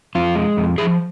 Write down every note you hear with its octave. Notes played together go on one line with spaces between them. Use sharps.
F2 F4
G#3
F2
F3 G#4